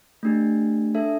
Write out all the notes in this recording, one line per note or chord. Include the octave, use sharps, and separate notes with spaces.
A3 D4 G4
D4 A4 E5